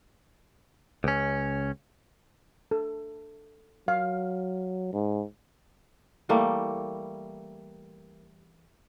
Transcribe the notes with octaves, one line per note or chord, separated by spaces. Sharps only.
C#2 C#4
A4
F#3 F5
G#2
E3 G3 A3 A#3